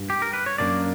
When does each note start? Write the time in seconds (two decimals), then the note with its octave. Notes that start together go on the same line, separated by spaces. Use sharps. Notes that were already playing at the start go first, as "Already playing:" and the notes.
Already playing: G2
0.10 G4
0.22 A#4
0.33 B4
0.46 C#5
0.58 F#2 D3 A#3 D4 D5